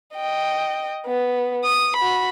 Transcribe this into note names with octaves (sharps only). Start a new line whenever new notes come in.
D#5 G5
B3
D#6
F#4 B5